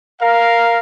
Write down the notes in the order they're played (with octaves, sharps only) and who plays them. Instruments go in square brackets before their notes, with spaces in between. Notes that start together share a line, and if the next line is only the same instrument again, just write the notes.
[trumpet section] A#4 F5